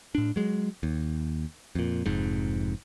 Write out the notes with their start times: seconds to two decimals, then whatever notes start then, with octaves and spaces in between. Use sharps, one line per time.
0.15 A2 D4
0.36 F#3 G#3
0.83 D#2
1.75 F2 A#2
2.06 F1 F2 G#2